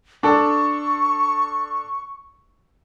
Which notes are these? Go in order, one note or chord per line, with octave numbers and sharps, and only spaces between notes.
D4 A4 C#6